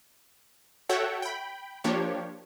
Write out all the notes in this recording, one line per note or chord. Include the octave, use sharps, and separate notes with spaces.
F#4 A4 C#5 E5 F#5 G5
G5 B5
F3 A#3 D4 G4 C#5